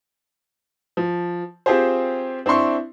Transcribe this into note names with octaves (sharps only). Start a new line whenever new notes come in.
F3
C4 F4 G4 G#4 C5
C4 D4 E4 C6 C#6